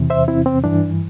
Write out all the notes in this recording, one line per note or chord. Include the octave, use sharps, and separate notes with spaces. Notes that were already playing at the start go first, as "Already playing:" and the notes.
Already playing: E2 C3 E3
C5 E5
C4 E4
C4
G2 E3 D4